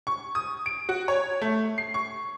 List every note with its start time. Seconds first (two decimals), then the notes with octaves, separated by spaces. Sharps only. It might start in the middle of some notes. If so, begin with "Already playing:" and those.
0.07 C#6
0.35 D#6
0.66 D7
0.89 F#4
1.08 C#5
1.42 A3
1.78 C7
1.94 C#6